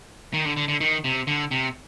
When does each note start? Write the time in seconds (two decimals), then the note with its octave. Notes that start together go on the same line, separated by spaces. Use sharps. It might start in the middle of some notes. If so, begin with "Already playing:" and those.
0.34 D#3
0.45 D3
0.57 D3
0.68 D3
0.80 D#3
1.04 C3
1.27 D3
1.51 C3